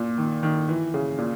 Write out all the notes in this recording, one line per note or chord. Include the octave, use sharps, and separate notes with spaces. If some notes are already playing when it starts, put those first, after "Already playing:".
Already playing: A#2
D#3
D#3
E3
C#3
A#2